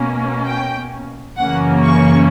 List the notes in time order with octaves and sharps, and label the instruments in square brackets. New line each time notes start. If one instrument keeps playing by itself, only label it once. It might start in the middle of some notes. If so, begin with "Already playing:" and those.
Already playing: [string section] B2 A#3 C#4
G5
F#2 C#3 E3 A#3 C#4 F#5
C#6